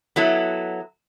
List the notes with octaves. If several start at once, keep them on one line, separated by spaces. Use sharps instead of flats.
F#3 B3 E4 A4